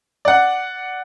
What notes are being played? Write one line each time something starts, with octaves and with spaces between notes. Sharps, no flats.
D5 F#5